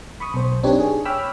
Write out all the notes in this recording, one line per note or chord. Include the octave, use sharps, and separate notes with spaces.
B5 C#6 D#6
B1 C5
C4 D4 D#4 G4 B4 C#5
G#4
C#5 G5 B5 D6 E6 F6